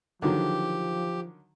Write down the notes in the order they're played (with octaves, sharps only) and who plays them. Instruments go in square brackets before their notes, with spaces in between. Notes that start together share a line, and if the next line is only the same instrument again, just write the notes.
[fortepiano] D3 D#3 F#3 [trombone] F3 [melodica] G4